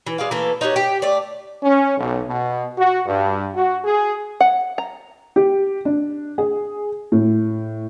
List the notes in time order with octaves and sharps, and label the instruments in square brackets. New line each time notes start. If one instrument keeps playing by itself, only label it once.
[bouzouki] E3
G#3 D5 F5
E3 A3 A#3 A4
D#4 F#4 G4 C#5
G4
A3 D5
[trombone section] C#4
B1
B2
F#4
G2
F#4
G#4
[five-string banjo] F#5
A#5
[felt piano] G4
D4
G#4
A2